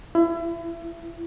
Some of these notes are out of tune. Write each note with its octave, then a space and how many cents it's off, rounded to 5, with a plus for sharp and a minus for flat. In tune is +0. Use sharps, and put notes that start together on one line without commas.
E4 +30